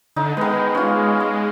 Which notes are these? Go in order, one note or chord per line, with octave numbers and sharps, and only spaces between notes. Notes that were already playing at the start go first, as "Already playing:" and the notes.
D3 D#4
D#3 G#3 B3
C#4 F4
C6